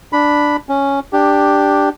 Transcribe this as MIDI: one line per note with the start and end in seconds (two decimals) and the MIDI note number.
0.13 0.57 62
0.13 0.57 83
0.69 1.00 61
1.13 1.89 62
1.13 1.89 67